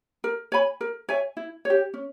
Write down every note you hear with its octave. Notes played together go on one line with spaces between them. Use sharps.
A#4
C#5 G#5 B5
A#4
C#5 E5 G#5
E4
G4 C#5
C#4